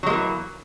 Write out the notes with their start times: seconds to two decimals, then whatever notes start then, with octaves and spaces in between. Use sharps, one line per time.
0.03 F#3
0.06 G#3
0.10 A#3
0.13 E3